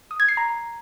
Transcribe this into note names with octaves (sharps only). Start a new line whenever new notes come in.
D#6
G#6
C7
A#5